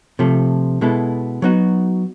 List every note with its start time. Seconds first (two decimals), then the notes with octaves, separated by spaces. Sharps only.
0.19 C3 F3 A3
0.81 B2 G#3 B3 E4 A4
1.42 F#3 B3 D#4 F#4